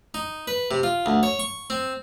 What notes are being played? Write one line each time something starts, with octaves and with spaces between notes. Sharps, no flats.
D#4
B4
C3
F4
D2
C#5
C#6
C4